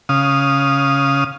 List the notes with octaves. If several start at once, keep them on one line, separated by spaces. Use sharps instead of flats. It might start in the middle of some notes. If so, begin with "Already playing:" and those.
C#3 F5 D#6